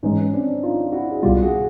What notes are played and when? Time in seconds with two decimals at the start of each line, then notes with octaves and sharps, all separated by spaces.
0.03 G#2 E3 G#3 C#4 D#4
0.33 C4 D4
0.63 D#4 F4
0.92 E4 F#4
1.11 G#4
1.23 C2 B2 G3 F4 G4
1.42 F#4 G#4